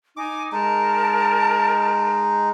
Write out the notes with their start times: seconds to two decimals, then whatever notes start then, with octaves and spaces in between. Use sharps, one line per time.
0.17 D#4 G#5 D6
0.52 G#3 D#4 A#4 A5